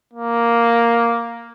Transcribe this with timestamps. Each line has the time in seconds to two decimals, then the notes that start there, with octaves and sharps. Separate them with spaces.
0.14 A#3